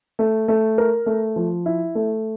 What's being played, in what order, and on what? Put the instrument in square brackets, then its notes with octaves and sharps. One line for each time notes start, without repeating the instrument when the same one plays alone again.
[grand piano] A3
A3
A#4
A3
F3
E4
A3